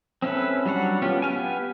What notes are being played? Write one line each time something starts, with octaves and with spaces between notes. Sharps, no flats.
C4 C#4 E4 A4 B4
F#3 G3 D4 C#5 F#5
B3 C#4 F4 G4
B3 G4 F5 G#5